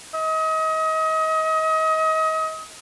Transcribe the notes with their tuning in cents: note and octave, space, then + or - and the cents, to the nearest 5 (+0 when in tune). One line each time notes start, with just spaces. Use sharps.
D#5 +35